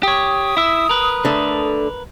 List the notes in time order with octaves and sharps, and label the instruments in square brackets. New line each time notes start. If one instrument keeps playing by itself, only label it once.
[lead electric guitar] G4 C#5 [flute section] D#6
[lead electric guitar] E4 E5
A#4 B4
[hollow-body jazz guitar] D3 A3